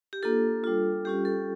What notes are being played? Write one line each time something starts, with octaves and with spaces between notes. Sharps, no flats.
G4
A#3 D4 F4 A4
G3 D4 F4
G3 C#4 F4 G4
A4